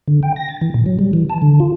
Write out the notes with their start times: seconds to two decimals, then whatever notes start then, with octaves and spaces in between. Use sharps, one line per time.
0.08 D3
0.23 G5
0.36 A#6
0.49 A6
0.61 E3
0.74 A#2
0.86 F#3
0.99 G3
1.13 E3
1.30 A5
1.42 D3
1.60 F4